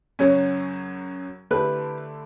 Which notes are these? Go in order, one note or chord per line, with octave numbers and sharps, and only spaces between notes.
F#2 C#3 F#3 C#4 C#5
D3 A3 E4 G4 B4